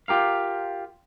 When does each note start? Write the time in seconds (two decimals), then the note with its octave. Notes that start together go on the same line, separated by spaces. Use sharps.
0.08 F4 G4 A#4 F5